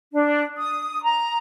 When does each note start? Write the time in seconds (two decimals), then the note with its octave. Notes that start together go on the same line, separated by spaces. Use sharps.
0.13 D4
0.57 D#6
1.03 A#5